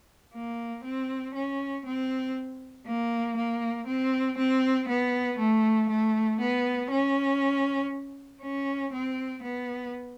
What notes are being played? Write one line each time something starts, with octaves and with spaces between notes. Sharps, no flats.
A#3
C4
C#4
C4
A#3
A#3
C4
C4
B3
A3
A3
B3
C#4
C#4
C4
B3